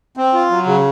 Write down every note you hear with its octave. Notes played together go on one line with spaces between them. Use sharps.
C4
F4
F#3
C#3